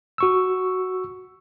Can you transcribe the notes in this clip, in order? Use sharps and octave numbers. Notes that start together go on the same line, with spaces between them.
F#4 C#6 E6